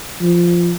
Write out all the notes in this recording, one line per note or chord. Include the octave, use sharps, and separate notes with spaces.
F3